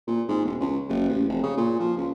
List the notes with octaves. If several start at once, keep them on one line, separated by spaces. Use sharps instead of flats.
A#2
G#2
E1
C#2
F#1
A1
F1
C#3
A#2
F3
C#2